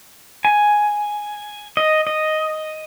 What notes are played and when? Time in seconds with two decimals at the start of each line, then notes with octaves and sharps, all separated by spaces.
0.45 G#5
1.77 D#5
2.07 D#5